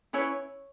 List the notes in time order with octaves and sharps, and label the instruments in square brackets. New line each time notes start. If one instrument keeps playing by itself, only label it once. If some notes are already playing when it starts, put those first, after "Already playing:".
[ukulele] C#4 E4 B4 C#5